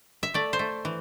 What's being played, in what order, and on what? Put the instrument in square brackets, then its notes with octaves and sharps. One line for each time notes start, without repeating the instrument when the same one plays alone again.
[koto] E5
A3 D5
C5
A3
E3